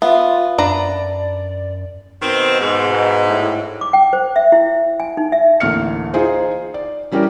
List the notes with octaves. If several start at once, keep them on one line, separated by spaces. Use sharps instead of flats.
B3 F4 E5 F5
F#2 D4 B4 D5 A#5
B2 D#3 C4
G#2
B2
A2
D6
G5
C5
E5
E4
G#5
D#4
E5
A1 D2 A#3 F6 C#7
D#4 F4 G#4 C5
D5
E3 G3 C#4 G4 A#4 D5